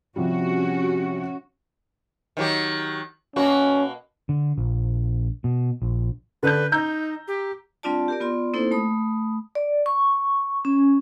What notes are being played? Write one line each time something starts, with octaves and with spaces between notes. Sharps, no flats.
C3 F3 G3 C#4 F#4
D#3 F#3 G4
B2 A#3 C#4 F#4
D3
A#1
B2
A#1
D3 D4 B4 G6
D#4 A#5 E6 G6
G4
G3 C4 D4 F4 D5 A5
G4 A#4 D5
B3 F4 D5 C6
A#3 C4 D#4 E4 A4 C5
A3 B5 D#6
D5
C#6
C#4